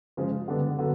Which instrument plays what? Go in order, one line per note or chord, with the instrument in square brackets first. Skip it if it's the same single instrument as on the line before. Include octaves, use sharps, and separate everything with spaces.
[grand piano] C#3 F3 G#3
D3 G3 B3 D4
D3 F#3 B3